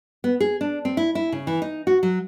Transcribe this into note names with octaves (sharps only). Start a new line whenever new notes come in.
B3
G#4
D4
C4
E4
E4
C#3
E3
D#4
F#4
F#3